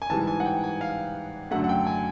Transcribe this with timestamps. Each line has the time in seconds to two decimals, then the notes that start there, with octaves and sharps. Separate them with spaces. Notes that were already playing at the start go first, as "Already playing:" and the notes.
0.02 G#5
0.10 G#2 E3 G3 A5
0.27 G#5
0.40 F#5
0.45 G5
0.64 G#5
0.81 F5
1.51 F#2 D3 F#3 A3 F#5
1.64 F#5
1.69 G5
1.87 G#5